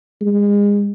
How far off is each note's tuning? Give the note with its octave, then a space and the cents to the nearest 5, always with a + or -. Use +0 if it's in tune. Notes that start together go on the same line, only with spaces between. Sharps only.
G#3 -30